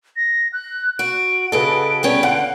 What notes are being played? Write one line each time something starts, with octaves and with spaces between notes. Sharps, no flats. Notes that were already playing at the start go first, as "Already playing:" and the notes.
A#6
F#6
F#4 D7
C#3 F#4 G#4 A4 B4 D#5
G3 B3 C#4
D3 F5 F#5